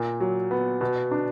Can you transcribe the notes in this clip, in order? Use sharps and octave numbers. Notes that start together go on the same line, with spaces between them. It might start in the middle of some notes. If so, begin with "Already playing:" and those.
Already playing: A#2 A#4
F#3
B3
B2
D4